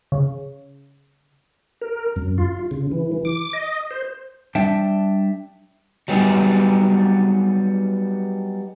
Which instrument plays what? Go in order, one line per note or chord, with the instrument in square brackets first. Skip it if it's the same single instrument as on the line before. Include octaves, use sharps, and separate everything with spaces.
[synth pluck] C#3
[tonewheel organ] A#4
F#2
F4
C#3
E3
E3
D6
D#5
C5
[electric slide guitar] G3 D4 E5 G5 A5
F#3 G3 B3 D#4 G#4